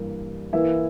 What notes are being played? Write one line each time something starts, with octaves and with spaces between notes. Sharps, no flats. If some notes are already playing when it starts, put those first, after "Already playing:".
Already playing: G2 E3 A#3
E3 A#3 E4